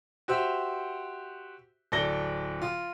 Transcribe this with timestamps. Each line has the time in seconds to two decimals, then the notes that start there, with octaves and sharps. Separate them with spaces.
0.28 F#4 G4 C5 E5
1.92 D1 A4 D5 A#6 G7
2.62 F4